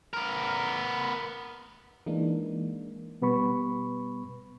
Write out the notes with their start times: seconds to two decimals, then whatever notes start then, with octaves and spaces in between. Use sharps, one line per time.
0.13 B3 A#4
2.06 E3 G#3 A#3 D4 D#4
3.21 B2 G3 B3 B4 B5 C#6